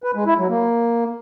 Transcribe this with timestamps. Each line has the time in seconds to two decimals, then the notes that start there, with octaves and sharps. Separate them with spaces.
0.04 B4
0.15 G#3
0.26 E4
0.38 F#3
0.49 A#3